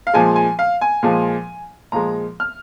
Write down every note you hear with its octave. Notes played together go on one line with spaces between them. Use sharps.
F5
A#2 F3 G#3 G#5
G#5
F5
G#5
A#2 F3 G#3
A#2 F3 G#3 A#5
F6